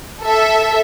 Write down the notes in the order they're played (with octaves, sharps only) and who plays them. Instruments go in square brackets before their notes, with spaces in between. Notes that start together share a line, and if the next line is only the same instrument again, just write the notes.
[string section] A4 E5